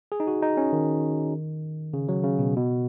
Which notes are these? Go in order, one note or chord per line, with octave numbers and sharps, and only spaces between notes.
G#4
D#4
F#4
D#4
C#4
D#3
C#3
F#3
C#3
B2
B2